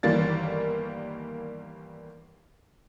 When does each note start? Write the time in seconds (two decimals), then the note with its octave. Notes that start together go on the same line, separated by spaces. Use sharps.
0.03 G1 D#3 E3 G3 A#3 A6